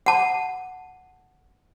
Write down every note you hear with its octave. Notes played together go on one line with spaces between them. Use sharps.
F#5 A5